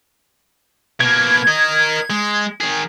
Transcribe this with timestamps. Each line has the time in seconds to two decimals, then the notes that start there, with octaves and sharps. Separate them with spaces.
1.00 B2 A#3 G#6
1.48 A#4 D#5
2.10 G#3
2.61 D#3 G#4